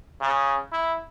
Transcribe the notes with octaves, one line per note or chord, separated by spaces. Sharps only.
C#3
E4